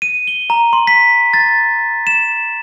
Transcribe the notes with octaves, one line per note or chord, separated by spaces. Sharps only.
D#7
G7
A#5
C6
B6
A6
E7